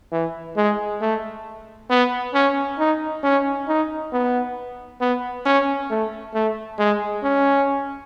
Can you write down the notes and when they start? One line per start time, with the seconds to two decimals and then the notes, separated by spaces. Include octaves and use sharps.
0.12 E3
0.57 G#3
1.01 A3
1.90 B3
2.34 C#4
2.79 D#4
3.23 C#4
3.68 D#4
4.13 B3
5.01 B3
5.45 C#4
5.90 A3
6.34 A3
6.78 G#3
7.23 C#4